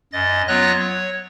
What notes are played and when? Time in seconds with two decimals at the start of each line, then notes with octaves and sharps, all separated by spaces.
0.13 F#2 D#5 A6
0.48 F#3 B3 F4 C#5 F#6 A#6
0.80 C#5